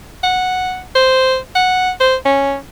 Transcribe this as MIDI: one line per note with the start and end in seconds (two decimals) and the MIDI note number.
0.23 0.82 78
0.95 1.37 72
1.55 1.91 78
2.00 2.15 72
2.25 2.56 61